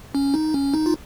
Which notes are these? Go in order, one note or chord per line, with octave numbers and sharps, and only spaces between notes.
C#4
D#4
C#4
D#4
F4